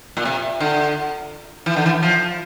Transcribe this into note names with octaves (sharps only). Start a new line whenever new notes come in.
A#2
C3
D3
E3
D3
E3
F3